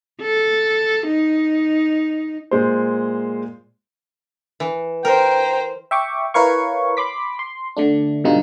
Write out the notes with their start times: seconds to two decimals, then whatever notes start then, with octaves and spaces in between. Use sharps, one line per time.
0.21 A4
1.07 D#4
2.51 A#2 G#3 C5
4.60 E3
5.05 A#4 C5 G5 A#5
5.91 E5 G5 C#6 D6
6.34 E4 A#4 B4 C#5 F5 C#6
6.97 B5 C6 D6 B6
7.39 C6
7.77 D3 A3 D4
8.24 G#2 B2 D3 G3 D#4 F4